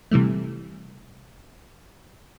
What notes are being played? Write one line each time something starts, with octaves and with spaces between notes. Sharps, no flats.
C3 E3 G3 A3